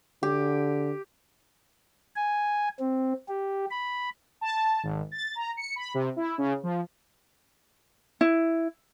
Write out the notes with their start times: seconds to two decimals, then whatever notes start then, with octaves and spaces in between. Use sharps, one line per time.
0.23 D3 G4
2.16 G#5
2.80 C4
3.29 G4
3.71 B5
4.41 A5
4.83 G#1
5.12 A6
5.35 A#5
5.57 C#7
5.76 B5
5.94 C3
6.16 E4
6.38 C#3
6.63 F3
8.21 E4